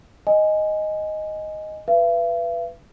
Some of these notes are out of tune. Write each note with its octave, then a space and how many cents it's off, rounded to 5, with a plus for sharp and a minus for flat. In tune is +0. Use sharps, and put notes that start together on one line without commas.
D#5 +0 G#5 +0
B4 +5 E5 +45